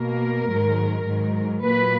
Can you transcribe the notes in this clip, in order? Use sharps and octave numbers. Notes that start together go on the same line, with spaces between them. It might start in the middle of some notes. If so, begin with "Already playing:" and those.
Already playing: B2 A#3 A#4
G#2 D#3 F#3
G#2 D#3 F#3
A#2 F#3 A#3 B4